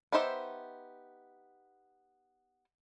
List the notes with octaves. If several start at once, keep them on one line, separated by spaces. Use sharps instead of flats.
B3 D#4 G4 C5 E5